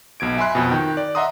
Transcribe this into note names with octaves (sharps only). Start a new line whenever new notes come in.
B1 B2 G#6 D7
E5 G#5 B5 C6 F#6
F2 B2
D#3 G5
D5
D#5 E5 F#5 A#5 C6 D#6